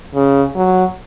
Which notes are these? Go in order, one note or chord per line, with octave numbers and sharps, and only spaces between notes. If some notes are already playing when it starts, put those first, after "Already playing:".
C#3
F#3